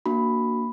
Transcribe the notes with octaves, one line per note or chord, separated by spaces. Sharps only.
A#3 D4 F#4 B5